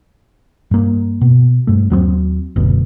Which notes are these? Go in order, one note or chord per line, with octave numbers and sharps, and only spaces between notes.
G2 A#3
B2
G2 A3
D#2 F#3 G#3 C4
F#1 D2 B2